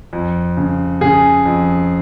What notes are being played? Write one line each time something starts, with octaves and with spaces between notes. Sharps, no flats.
F2
C#3
C#3 G#4
F2